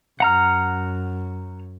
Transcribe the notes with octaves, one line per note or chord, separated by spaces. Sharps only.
F#2 F#5 A#5 F6